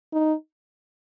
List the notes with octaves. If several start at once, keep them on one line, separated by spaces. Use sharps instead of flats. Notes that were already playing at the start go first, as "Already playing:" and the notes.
D#4